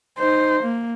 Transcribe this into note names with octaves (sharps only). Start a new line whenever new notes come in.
D#4 C5
A#3